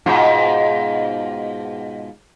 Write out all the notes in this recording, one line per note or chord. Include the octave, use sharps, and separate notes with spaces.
G#2 B2 F4